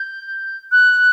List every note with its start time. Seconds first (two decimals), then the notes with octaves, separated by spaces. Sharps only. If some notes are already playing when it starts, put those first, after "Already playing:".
Already playing: G6
0.72 F#6